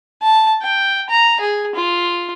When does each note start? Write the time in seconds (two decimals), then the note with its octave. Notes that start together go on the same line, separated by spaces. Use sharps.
0.22 A5
0.62 G5
1.10 A#5
1.41 G#4
1.75 F4